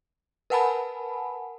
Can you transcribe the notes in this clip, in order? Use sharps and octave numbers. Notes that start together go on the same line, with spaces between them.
A#4 B4 F#5 G#5 A5 B5